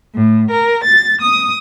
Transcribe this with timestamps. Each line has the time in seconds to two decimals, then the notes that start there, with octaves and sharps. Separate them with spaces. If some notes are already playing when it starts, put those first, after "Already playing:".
0.14 A2
0.51 A#4
0.84 A6
1.22 D#6